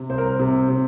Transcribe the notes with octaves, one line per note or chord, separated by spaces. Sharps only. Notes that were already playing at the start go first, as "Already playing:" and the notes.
Already playing: C3
C2 C5
A#4
C5
C3
C3